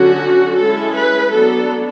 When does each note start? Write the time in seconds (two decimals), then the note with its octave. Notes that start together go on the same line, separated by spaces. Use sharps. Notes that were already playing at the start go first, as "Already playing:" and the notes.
Already playing: D3 F#3 C#4 F#4
0.58 G#3 C#4 E4 A4
0.95 B4
1.31 F#3 B3 D4 A4